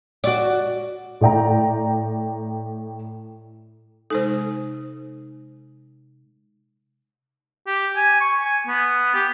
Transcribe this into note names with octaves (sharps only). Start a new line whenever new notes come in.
F#4 D5
A2 D5 G5 A#5
C3 G#3 D#4 A4 C5
G4
G#5
C#6
G#5
B3
G4